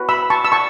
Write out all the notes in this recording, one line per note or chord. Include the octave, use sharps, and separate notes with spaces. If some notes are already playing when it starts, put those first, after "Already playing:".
Already playing: F#4 B4
B5 E6
A5 C#6
E6
A5 C#6